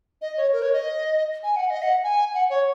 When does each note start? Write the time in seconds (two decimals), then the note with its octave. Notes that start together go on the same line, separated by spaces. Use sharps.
0.22 D#5
0.37 C#5
0.53 A#4
0.62 C#5
0.73 D#5
1.43 G#5
1.56 F#5
1.70 D#5
1.82 F#5
2.04 G#5
2.34 F#5
2.50 C#5